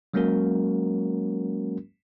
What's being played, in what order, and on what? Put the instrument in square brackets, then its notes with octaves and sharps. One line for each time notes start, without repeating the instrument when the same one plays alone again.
[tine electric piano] F#3 G#3 A#3 C#4 F#4 A#4